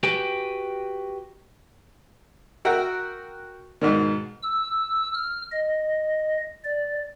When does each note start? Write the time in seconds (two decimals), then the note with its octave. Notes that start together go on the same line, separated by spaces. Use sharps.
0.03 F#4 G4 B4 G5 G#5
2.65 F#4 A#4 E5 F#5 G5
3.81 G#2 B2 D#3
4.42 E6
5.14 F6
5.52 D#5
6.64 D5